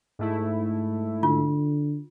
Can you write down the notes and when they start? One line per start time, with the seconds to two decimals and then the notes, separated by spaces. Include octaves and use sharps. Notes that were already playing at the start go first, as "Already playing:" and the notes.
0.19 G#2 A3 E4
1.23 D3 F4